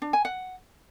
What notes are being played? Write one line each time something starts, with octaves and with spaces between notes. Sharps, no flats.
D4
G#5
F#5